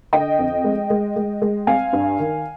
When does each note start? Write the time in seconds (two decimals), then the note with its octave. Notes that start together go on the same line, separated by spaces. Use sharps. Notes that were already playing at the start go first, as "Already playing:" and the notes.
0.13 D3 D#5 G5
0.39 F2
0.64 G#3
0.90 G#3
1.16 G#3
1.42 G#3
1.67 C4 F5 G#5
1.93 G2
2.19 D#3